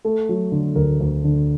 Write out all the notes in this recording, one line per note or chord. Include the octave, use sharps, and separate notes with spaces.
A3 A4
F#3
D3
D2 A#4
D2
D3